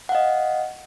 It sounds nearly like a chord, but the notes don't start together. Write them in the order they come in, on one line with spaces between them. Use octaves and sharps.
F#5 F5 D#5